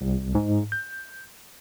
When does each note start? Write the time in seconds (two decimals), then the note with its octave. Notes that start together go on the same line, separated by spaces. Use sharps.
0.01 C2
0.35 G#2
0.72 G6